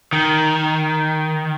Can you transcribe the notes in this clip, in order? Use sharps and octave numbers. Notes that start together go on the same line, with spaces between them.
D#3